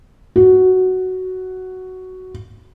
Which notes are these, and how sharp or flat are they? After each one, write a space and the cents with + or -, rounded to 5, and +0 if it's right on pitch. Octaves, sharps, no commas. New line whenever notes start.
F#4 +5